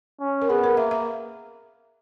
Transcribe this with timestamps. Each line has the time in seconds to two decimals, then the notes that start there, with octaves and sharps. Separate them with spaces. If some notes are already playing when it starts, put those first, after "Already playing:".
0.21 C#4
0.42 A#4
0.49 B3 G#4
0.64 A#4
0.77 A#3 E5
0.91 E5